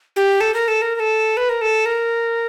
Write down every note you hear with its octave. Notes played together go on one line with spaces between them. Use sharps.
G4
A4
A#4
A4
A#4
A#4
A4
B4
A#4
A4
A#4